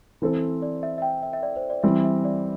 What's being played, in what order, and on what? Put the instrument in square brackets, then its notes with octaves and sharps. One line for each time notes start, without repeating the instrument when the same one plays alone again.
[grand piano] E3 C4 A4 C5
[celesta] D5
E5
E5
G5
E5
E5
D5
C5
D5
[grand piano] E3 G3 C4 [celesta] E5
[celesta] E5
D5